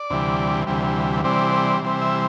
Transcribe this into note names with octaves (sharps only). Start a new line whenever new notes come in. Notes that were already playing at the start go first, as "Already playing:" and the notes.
Already playing: D5
D2 C3 E3 G3
D2 C3 E3 G3
C3 E3 G3 C4 D5
C3 E3 G3 C4
E5